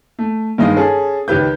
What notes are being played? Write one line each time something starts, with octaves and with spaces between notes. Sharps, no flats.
A3
G2 D#3 G#3 D#4 D#5 F5
C#4 G#4 A4
C#2 D#3 G4 B4 G6